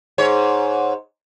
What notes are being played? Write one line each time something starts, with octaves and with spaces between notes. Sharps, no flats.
G#2 C#5